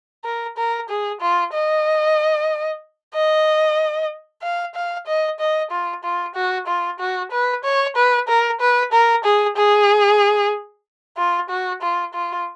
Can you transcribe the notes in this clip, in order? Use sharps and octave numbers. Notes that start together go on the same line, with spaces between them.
A#4
A#4
G#4
F4
D#5
D#5
F5
F5
D#5
D#5
F4
F4
F#4
F4
F#4
B4
C#5
B4
A#4
B4
A#4
G#4
G#4
F4
F#4
F4
F4